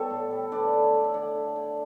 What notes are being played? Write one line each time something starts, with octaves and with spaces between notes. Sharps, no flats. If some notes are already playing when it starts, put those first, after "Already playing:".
Already playing: G3 B3 A4 C#5
A2
G3
D3 B4 D5
A3
C#5
A3 D5
E5
D3 D5 F#5
D3
D3